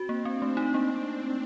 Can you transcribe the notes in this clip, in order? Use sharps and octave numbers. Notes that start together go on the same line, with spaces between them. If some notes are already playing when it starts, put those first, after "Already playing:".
Already playing: C4 F#4
A#3
C4 D4
A3
D#4
A#3